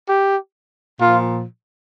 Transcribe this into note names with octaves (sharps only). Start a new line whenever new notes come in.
G4
A#2 F3 F4